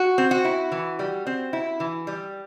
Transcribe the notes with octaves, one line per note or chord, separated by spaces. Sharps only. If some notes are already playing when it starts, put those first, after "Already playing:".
Already playing: F#4
C4
F#4
E4
E3
G3
C4
E4
E3
G3